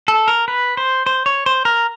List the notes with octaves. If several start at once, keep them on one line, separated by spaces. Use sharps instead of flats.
A4
A#4
B4
C5
C5
C#5
C5
A#4